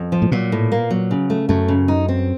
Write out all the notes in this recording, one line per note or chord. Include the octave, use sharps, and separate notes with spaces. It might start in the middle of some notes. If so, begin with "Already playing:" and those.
Already playing: F2
F3
A2
A#2 F#3
A2
A#3
F#3
C#3
A3
F#2 A3
C#3
D#4
C4